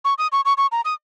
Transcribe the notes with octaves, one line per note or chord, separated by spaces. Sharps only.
C#6
D#6
C#6
C#6
C#6
A#5
D#6